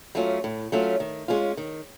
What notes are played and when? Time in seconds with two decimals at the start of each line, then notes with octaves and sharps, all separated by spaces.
0.15 F#3 A3 C#4 F4
0.44 A2
0.72 F#3 A3 C#4 F4
1.00 D#3
1.28 G#3 C#4 F4
1.57 D#3